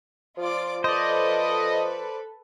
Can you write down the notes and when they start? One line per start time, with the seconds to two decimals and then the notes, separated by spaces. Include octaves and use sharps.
0.38 F3 F4 D5 D6
0.84 A4 B4 C5 D5 D#5